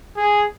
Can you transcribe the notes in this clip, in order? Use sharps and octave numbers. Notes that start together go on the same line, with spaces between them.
G#4